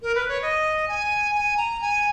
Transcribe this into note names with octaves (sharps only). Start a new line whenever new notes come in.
A#4
B4
C#5
D#5
G#5
G#5
A#5
G#5